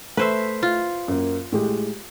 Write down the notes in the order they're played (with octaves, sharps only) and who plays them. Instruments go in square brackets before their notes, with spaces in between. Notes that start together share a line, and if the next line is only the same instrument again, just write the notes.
[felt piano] A3 [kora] B4 C5 E5
[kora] F4
[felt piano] F#2 A#3
A2 G#3 G4